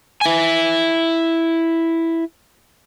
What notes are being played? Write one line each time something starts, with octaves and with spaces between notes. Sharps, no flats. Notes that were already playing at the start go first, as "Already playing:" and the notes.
E4 G#5